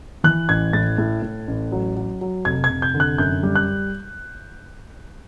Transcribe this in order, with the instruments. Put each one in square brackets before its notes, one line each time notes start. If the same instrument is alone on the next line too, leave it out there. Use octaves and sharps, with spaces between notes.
[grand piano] E3 F#6
A1 G#6
A2 A6
A2
A2
A1
F#3
F#3
F#3
F1 G#6
G#6
F1
G6
D3
F#6
F#2 G6
G3
F#6